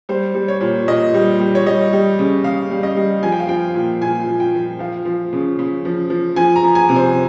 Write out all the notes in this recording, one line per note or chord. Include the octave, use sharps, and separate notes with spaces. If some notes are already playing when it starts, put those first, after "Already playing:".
G3 C5
G3
C#5
A#2
A#2 D#5
G3
G3
C#5
G3 D#5
G3
C#3
C#3 F5
G3
D#5
G3
F3 G#5
G5
F5
F3 G5
A#2
A#2 G#5
F3
G5
F3
F3 F5
F3
C#3
C#3
F3
F3
F3 G#5
A#5
F3
G#5
C3
C5